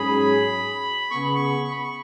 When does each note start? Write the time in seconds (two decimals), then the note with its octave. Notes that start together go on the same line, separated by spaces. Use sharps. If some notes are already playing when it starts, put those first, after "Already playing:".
Already playing: G#2 F#3 C#4 G#4 B5
1.10 C#3 B3 G#4 C#6
1.23 B5
1.35 C#6
1.71 B5
1.83 C#6